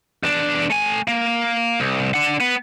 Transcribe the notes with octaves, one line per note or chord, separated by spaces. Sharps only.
E2 D4
A3 G#5
A#3
C2
D4 F#5
B3